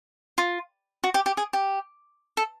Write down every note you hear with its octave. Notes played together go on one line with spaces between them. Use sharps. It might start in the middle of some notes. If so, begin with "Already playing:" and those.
F4
F#4
G4
G4
G#4
G4
A4